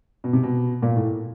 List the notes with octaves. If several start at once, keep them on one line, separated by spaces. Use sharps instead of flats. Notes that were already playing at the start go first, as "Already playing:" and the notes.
B2
C3
B2
A#2
A2